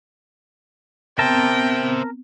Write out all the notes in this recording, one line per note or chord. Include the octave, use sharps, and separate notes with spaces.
B3 C4 A#4 C5 E5 G5 A5